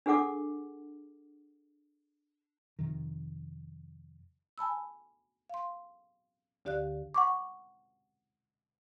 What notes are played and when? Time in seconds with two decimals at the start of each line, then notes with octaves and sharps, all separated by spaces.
0.06 D4 G#4 A4 F#5 D6
2.79 F2 C3 D#3
4.58 G#5 A5 B5 E6
5.50 F5 C6
6.65 D2 D3 G4 D5 F5 F#6
7.14 F#5 C#6 D6